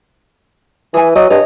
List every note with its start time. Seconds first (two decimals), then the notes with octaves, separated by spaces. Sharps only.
0.94 E3 G#4 G#5
1.15 F#3 D#5
1.30 G2 C#5 D#5